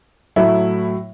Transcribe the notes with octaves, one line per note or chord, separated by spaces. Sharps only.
A2 F#3 A3 E4